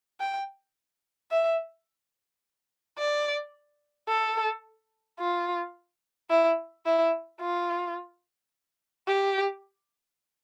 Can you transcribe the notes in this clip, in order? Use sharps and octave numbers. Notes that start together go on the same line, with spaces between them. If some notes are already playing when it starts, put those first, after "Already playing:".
G5
E5
D5
A4
F4
E4
E4
F4
G4